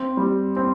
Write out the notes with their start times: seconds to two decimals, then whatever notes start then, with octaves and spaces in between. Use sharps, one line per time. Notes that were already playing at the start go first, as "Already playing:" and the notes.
Already playing: C4
0.17 G3
0.56 C4